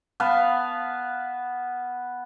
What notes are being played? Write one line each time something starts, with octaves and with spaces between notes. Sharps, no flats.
B3 B4 F5 A5